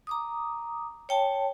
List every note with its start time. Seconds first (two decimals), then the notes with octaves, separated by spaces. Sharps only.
0.07 A#5 D6 D#6
1.09 C#5 G5 A5